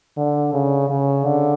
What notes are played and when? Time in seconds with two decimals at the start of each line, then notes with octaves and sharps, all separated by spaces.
0.17 D3
0.54 C#3
0.90 C#3
1.26 D3